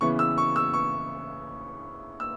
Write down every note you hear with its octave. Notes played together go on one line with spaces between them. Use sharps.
C#3 E3 B3 C#6
E6
C#6
E6
C#6
E6